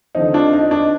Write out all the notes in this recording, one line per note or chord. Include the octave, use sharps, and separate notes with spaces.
D3 F3 C4 D#4
D4 F4
D#4
D4